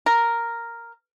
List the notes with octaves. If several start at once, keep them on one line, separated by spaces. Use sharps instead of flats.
A#4